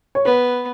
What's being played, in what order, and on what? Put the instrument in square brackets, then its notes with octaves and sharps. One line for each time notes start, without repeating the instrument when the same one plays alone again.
[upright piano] C#5
[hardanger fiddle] B3 [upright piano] B4